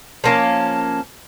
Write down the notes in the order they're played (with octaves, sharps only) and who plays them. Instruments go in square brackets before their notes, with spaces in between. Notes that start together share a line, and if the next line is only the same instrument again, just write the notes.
[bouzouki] F3 A#3 C#4 [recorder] A5